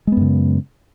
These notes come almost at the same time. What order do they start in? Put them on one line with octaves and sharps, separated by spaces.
G#3 B3 F#2 C#3